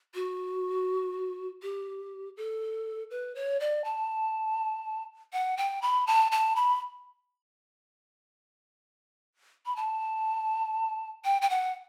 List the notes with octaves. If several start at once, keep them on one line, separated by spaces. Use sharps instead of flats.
F#4
G4
A4
B4
C#5
D5
A5
F#5
G5
B5
A5
A5
B5
B5
A5
G5
G5
F#5